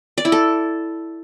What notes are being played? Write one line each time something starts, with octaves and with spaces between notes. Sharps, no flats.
D5
E4
A4